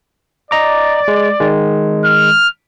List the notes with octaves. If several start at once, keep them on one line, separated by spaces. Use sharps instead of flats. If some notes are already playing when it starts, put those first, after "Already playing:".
D5 D#5 A#5 D6
G#3
D#3 G#3
F6